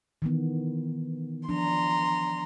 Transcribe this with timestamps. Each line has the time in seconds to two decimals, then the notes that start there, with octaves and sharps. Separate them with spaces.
0.22 D#3 E3 B3
1.49 F3 D4 A#5 C6